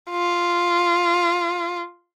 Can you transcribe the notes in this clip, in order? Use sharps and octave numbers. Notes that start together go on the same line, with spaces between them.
F4